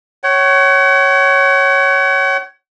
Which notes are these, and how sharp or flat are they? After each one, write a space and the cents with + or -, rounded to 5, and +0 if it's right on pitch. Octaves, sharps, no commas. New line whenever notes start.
C#5 +0 F#5 +40